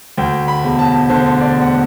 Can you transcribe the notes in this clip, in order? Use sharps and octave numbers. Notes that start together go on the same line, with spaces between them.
D2 G5
B5
E1
A5
D3 C5
D5
E1 F#5